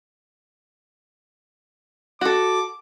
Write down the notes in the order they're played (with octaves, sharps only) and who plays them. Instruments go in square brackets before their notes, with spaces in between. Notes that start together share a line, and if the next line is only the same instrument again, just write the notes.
[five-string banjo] F#4 A4 [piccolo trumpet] D6